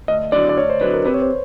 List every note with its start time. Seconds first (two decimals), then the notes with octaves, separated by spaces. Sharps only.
0.08 D2 D#5
0.32 D3 F#3 D5
0.49 D5
0.56 D2 C#5
0.70 C5
0.81 D3 F#3 B4
0.93 A#4
1.05 C3 B4
1.14 C#5
1.22 C5